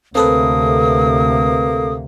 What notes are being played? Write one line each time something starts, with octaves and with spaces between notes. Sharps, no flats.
D2 C3 A#3 C4 A4 B4 D#6